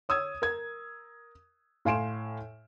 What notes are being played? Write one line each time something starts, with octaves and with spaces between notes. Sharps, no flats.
C#5 D#6 E6 G#6
A#4 G#6
A2 F5 G#5 C6 D7 E7